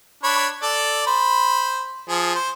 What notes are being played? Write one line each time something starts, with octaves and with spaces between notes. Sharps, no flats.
D4 C#5 B5
A4 D5
C5 B5
F3 G#4
C5